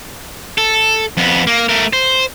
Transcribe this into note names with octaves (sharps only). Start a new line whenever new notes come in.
A4
F2 B3
A#3
A3 A#4
C5